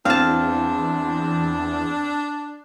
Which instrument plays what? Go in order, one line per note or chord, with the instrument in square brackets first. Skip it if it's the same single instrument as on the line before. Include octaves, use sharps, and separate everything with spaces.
[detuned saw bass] E2 [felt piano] C4 [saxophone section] D4 [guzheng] F5 A5